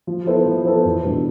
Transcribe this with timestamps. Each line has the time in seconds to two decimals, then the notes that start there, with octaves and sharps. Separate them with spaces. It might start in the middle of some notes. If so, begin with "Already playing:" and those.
0.07 F3
0.27 B3 E4 A4 C5
0.46 F3
0.65 B3 E4 A4 C5
0.85 E2
1.04 B2 G#3 B3 D4